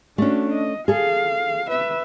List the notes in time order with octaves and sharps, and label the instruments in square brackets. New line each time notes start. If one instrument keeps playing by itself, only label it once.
[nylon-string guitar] A3 C#4 [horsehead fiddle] D4 F#4
[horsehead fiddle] D#5
[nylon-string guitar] G#4 A4 [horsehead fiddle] F5
[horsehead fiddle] B4 E5